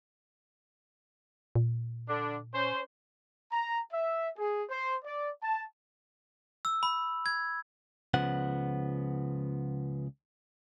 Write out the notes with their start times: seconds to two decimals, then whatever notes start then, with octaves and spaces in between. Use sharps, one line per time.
1.55 A#2
2.08 D3 D4
2.54 C#4 C5
3.51 A#5
3.92 E5
4.38 G#4
4.69 C5
5.05 D5
5.43 A5
6.65 E6
6.83 B5
7.26 G#6
8.14 C#2 C#3 F3 B3 F#5